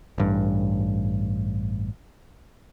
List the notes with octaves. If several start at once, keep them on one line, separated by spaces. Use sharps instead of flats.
A1 G2